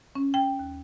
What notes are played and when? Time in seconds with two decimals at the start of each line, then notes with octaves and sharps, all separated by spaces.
0.15 C#4
0.34 G5
0.59 D#2